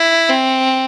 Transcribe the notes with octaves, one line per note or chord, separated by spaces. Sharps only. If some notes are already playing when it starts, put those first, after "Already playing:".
Already playing: E4
C4